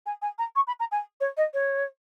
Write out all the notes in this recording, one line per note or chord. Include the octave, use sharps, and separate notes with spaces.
G#5
G#5
A#5
C#6
B5
A#5
G#5
C#5
D#5
C#5